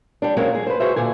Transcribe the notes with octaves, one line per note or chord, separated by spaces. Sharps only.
G3 D4
F#3 G#3 A#3 C4 C#4 F#4
G#4
B4 C5
F#4 G#4 C5 E5
A#2 D3 G#5